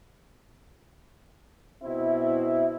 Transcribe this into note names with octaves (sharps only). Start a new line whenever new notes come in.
B2 C4 E4